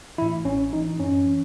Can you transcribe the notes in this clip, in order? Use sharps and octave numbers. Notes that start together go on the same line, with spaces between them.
A2 E3 E4
A1 C#4
A2 E3 D#4
D#4
F#2 C#4
E3